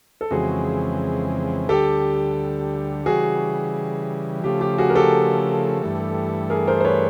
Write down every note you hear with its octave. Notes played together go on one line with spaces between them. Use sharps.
A4
F2 C#3 E3 G#3 C4 F#4 G#4
D2 D3 G3 G4 A4
C#3 E3 G3 F#4 G#4
C#3 F3 A3 G4
G4
F#4 G#4
A#4
G4 A4
G2 E3 A3
G#4 A#4
A#4 C5
C5
B4 C#5